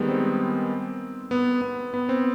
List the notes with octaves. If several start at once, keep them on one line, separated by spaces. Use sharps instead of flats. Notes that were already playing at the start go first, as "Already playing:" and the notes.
Already playing: D#3 G3 G#3 B3
C4
B3
B3
B3
C4